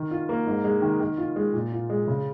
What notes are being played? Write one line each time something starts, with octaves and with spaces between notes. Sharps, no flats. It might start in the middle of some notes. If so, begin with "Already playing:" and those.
Already playing: D#3
F4
A#3
G#2
G#3
D#3
D#3
F4
G#3
A#2
F4
G#3
C#3